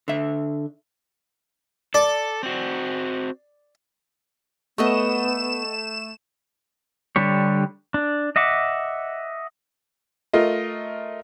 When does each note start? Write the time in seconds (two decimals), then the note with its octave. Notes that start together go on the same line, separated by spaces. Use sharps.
0.08 D3 E5
1.94 A4 D5
2.43 C4 F#4
4.78 A3 B3 C#5 D#5 F#5 E7
7.16 D3 G3 D4 G4 C#5
7.94 D4
8.36 D#5 E5 F#5 D6
10.33 A3 F4 A#4 D#5